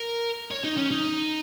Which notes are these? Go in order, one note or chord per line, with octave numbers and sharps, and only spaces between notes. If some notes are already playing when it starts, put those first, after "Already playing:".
Already playing: A#4
C#5
D#4
C#4
D#4